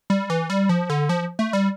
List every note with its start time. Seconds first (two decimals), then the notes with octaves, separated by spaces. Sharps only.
0.10 G3
0.30 E3
0.50 G3
0.69 F3
0.90 D3
1.09 F3
1.39 A3
1.53 G3